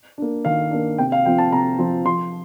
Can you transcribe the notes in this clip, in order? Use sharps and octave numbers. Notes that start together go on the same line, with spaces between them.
A#3 D4
D#3 F5
A#3 D4
C3 G5
F5
F3 C4 F4 G5
A5
C3 A#5
F3 C4 F4
F3 C6